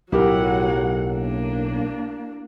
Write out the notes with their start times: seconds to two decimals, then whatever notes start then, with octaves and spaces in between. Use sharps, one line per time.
0.12 B1 A2 F#3 E4 G4 A#4 F#5
1.11 A#3 D4